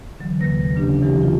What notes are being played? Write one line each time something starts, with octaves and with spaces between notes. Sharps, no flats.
D3 E3 F#3
D#2 C3 A#3 B4 A#6
C#3 A#3 C#4 D4 G4
C3 E3 F#3 D#4 E4 G4
D4 F4